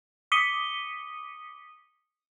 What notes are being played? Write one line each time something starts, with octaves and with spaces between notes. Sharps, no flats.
D6 D#6 B6 C#7 D#7 G7